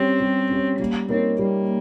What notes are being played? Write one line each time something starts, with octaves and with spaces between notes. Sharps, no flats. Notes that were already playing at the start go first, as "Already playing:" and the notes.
Already playing: G3 C4 C#4 G4 C#5
G3
C#4 G4 C#5
G3 A#3
A#3 C4 D#4 A#4 C#5
G3 A#3